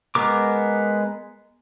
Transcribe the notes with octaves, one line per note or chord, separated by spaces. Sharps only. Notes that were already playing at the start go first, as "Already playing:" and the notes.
G#3 B3 A#4 D6